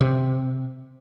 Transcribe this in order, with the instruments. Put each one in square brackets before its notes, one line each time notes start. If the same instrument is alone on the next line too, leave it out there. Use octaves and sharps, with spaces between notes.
[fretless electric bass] C3